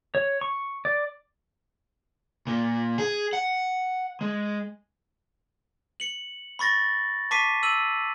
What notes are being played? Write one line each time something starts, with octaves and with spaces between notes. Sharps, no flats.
C#5
C#6
D5
A#2
G#4
F#5
G#3
C#7 F#7
B5 C#6 A6 A#6
A5 C#6 D6 B6 C7 D#7
E6 D#7 F#7